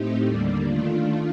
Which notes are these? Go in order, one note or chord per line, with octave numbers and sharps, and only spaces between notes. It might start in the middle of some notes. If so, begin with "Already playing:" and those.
Already playing: A2 A3 C4 D#4 G4
D#2 D3 G3 A#3 D4
D#3 A3 D4 F4